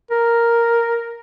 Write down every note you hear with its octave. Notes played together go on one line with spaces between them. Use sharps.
A#4